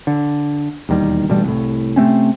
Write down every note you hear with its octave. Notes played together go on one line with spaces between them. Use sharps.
D3
E1 D#2 D#3 G3
A1 G2 B2 G3
C2 A2
C3 A3 C4 C#4